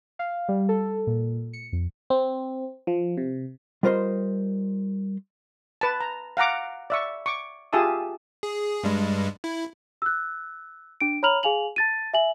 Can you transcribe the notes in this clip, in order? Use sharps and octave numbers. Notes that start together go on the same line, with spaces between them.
F5
G3
A4
A#2
C#7
F2
C4
F3
C3
G3 F4 A#4 C5 D#5 C6
B4 A5
A#5
F5 F#5 A#5 D6
D5 E5 C#6
C#6 D6
F4 G4 G#4 E5 A5 D#6
G#4
G2 G3 G#3
E4
E6 F#6
D4 D7
C#5 A#5 B5 F6 F7 F#7
G#4 F5 G#5 F7 F#7
A5 A6 D#7
E5 G#5 F#7